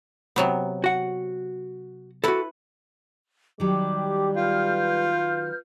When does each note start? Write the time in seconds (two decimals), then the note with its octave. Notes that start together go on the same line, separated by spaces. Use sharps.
0.36 C3 F#3 B3
0.84 F#4 F#5
2.24 E4 F#4 A4 B4
3.60 D#3 F#3 G3 G4 D6
4.36 F4 B4 F6 G6